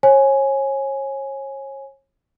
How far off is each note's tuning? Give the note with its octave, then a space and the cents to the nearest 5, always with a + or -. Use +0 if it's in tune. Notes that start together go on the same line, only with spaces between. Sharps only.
C#5 -30 G#5 +5